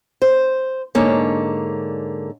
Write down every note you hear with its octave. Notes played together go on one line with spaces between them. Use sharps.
C5
G#2 D3 A#3 C#5